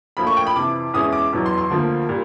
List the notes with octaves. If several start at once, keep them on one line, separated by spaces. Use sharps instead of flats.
A#1 A#2 F3 A3 B5
C#6
G5
B5
F2 C3 E3 D6
E2 B2 G#3 C#4 E4 D#6
D6
E2 B2 F#3
C6
C6
D2 D3 F3 A#3
A#2 G3